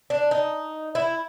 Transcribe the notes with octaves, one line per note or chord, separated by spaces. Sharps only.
D4
D#4
E4